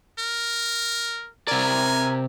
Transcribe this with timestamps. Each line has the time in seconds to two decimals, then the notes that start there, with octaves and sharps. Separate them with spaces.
0.19 A#4
1.48 C3 A#4 D5 G#5